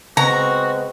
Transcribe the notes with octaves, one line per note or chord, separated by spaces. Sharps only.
C#3 G#3 B3 C4 F#4 A#5